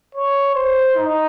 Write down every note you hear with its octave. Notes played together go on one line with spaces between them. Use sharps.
C#5
C5
D#4